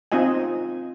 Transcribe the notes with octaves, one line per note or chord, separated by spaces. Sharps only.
C4 D#4 F4 D#5 G#5